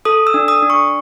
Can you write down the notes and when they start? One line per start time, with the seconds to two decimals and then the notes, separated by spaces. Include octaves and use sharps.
0.05 A4 D#6
0.27 E6
0.34 D4
0.48 D#6
0.63 D4
0.70 C#6